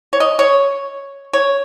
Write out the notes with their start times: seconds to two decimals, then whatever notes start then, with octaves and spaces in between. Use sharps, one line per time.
0.13 C#5
0.20 D#5
0.39 C#5
1.33 C#5